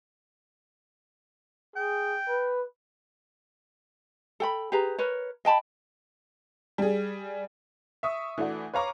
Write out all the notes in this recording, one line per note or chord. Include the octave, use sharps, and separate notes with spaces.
G#4 G5
B4
A4 G5 B5
G4 G#4 B4 A#5
A#4 B4 C#5
D#5 G5 A5 B5
G3 G#4
E5 C#6 D#6
E3 A3 D4 F#4
B4 C#5 F5 A#5 C#6 D6